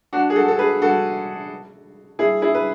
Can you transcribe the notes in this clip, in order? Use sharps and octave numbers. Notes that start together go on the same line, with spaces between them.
D4 F#4
G#4
F#4 A4
A4
G#4 B4
F#4 A4
E4 G#4
E4 G#4
B4